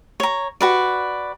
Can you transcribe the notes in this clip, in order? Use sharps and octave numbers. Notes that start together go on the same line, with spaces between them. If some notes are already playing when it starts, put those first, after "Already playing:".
C#5 A#5
F#4 B4 D5